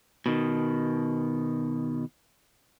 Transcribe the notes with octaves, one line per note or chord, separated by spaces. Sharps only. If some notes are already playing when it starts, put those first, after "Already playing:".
B2 D#3